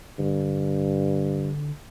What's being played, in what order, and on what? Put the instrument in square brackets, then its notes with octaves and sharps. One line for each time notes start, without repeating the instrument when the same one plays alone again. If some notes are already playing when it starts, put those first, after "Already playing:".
[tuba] G2 [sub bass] D3